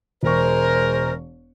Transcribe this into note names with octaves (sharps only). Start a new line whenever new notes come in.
E1 G#3 A#4 C5 C#6